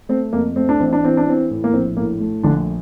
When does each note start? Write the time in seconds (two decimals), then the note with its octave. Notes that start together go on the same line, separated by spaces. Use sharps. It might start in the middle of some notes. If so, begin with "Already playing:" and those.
0.09 A3 C4
0.33 F2 A#3
0.56 A3 C4
0.69 D4
0.80 A1 C4
0.93 D4
1.03 E3 C4
1.17 D4
1.27 E3 C4
1.50 A2
1.64 A#3
1.73 A#1 C4
1.97 A2 A#3
2.20 A3
2.43 A#1 D3 D4